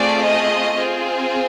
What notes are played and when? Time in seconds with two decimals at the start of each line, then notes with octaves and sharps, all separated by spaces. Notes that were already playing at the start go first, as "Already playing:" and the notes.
Already playing: A3 C4 F4 G#4 D5
0.23 D#5
0.77 C4 F4 G#4